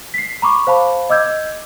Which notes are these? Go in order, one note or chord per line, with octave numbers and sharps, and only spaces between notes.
B6 C7
A#5 B5 C#6 D6
C5 F5 A5 B5
D#5 D6 E6 G6 G#6